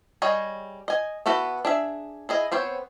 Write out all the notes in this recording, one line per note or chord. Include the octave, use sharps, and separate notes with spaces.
G3 G#4 C#5 D#5
D#5 G#5
B3 E4 F#4 A4 B4
D4 G#4 E5
E4 G#4 D#5
B3 C4 C5 C#5